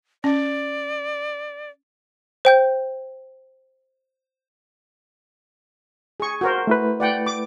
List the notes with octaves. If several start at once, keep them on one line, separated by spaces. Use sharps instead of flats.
C#4 D5
C5 G5 G6
G#4 C#6
F#4 A#4 C5
A3 E4 B4
D5 F#5 G5
D6